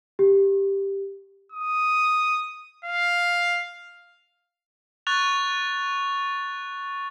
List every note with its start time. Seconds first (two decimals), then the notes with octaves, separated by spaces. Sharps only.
0.19 G4
1.52 D#6
2.85 F5
5.07 C#6 F#6 A6 F7